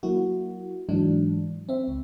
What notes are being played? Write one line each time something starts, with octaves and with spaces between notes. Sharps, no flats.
F#3 A#3 E4 F#4
G#2 E3 F#3 D4
C4 E5
C#2